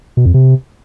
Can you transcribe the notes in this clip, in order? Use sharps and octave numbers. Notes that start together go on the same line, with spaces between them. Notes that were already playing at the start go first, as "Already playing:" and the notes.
B2
F2
C3